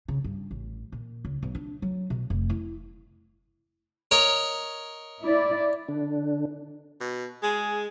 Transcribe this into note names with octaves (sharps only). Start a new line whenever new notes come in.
C#3
G2
A1
A#2
C#2
B1
D4
F#3
B2
F1
E4
A#4 C#5 D#5
E4 D5
D3 D4
B2
G#3 G#4